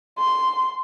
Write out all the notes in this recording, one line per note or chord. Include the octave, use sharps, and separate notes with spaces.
C6